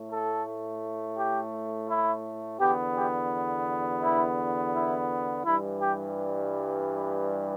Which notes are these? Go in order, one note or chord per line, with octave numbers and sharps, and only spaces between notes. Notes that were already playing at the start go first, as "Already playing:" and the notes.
Already playing: A2 A3
A4
G4
E4
E2 D3 B3 G4
G4
E4
E4
G2 E3 G3 E4
G4